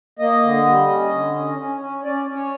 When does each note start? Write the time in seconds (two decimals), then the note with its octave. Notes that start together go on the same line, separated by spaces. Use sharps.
0.19 A#3 D#5
0.43 D3
0.66 G3
0.89 C#4
1.11 D3
1.35 C#4
1.58 C#4
1.81 C#4
2.04 C#4 D5
2.27 C#4
2.35 C#5